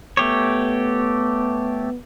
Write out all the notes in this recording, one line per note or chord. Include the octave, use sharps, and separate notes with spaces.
A3 B3 G4 C#5